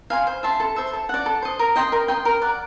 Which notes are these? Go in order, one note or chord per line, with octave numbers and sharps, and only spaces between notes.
F5 G#5 C6
C5
E5 A5 C6
A4
C5 E5
A4
D5 F#5
A4
C5 D#5
A#4
D#5 G5 C6
A#4
D#5 G5 C6
A#4
D5 F#5